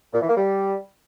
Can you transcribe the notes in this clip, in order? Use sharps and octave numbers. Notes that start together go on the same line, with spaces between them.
A#2
E3
A#3
G3